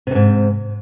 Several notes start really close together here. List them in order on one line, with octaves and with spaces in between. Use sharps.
C3 F2 G#2